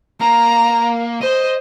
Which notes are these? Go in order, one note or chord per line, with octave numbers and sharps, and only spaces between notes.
A#3 A#5
C5 D#5